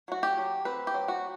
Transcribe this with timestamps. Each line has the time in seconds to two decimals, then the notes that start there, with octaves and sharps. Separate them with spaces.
0.08 F#3 F#4
0.23 G4
0.38 F#3
0.65 C4 B4
0.87 G4
0.94 F#3
1.08 F#4